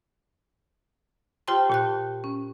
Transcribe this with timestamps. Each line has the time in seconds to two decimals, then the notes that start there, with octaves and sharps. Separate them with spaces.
1.48 F4 G4 C5 G5 A5 C6
1.70 A#2 G4 F#6
2.24 C#4